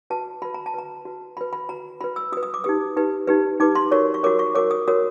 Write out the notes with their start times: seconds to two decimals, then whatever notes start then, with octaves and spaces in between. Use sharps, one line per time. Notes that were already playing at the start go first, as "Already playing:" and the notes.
0.10 F#4 B4 A5
0.42 F#4 B4 B5
0.54 A#5
0.66 A5
0.74 F#4 B4 A#5
1.05 F#4 B4
1.37 F#4 B4 B5
1.53 B5
1.69 F#4 B4 A#5
2.01 F#4 B4 B5
2.16 E6
2.32 F#4 D#6
2.37 B4
2.43 D#6
2.54 D6
2.64 D#4 G4 B4 D#6
2.97 D#4 G4 B4
3.27 D#4 G4 B4
3.60 D#4 G4 B4 D6
3.75 C6
3.91 F#4 A#4 C#5 C#6
4.14 C#6
4.23 F#4 A#4 C#5 D6
4.39 C#6
4.55 F#4 A#4 C#5 D6
4.71 D#6
4.88 F#4 A#4 C#5 D#6